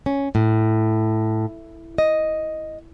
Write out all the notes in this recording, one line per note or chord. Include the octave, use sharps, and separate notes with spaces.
C#4
A2
D#5